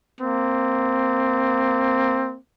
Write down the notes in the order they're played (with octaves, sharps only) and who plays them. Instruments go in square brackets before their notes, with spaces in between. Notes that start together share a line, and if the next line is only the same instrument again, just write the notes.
[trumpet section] A#3 C4